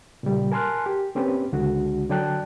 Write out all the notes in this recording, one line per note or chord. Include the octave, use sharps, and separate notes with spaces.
A#2 C#3 G3
A#4 G#5 A5 C6 F6 F#6
G4
A#3 C4 C#4 G4 B4
C#2 D3 G#3 D4 F#4
D3 F#3 D5 G5 A5 F#6